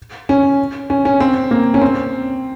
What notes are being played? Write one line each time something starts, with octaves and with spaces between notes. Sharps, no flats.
C#4
C#4
C#4
C4
A#3
C#4
C4